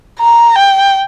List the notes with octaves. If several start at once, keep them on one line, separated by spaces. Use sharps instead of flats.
A#5
G5